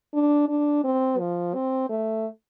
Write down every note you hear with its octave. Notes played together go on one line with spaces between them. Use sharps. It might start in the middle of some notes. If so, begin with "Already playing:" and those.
D4
D4
C4
F3
C4
A3